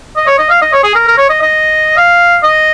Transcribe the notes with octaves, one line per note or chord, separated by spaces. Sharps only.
D#5
C#5
D#5
F5
D#5
C#5
G#4
A#4
A#4
C#5
D#5
D#5
F5
D#5